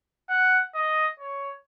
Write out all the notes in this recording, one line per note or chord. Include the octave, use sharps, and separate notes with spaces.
F#5
D#5
C#5